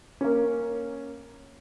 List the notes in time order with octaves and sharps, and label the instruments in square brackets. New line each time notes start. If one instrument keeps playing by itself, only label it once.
[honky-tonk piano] A#3 C#4